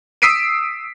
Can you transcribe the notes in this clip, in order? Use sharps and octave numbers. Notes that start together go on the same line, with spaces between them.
D#6 E6 B6 C7 D7 D#7